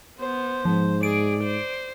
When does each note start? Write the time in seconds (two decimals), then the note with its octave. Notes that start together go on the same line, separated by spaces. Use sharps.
0.20 B3 C5
0.65 G#2 F3
1.03 G#4 D5 D7
1.44 C5